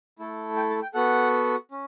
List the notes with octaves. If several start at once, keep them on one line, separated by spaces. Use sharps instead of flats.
A3 E4 A4
G5
A5
G5
B3 F#4 A4 F#5
C#4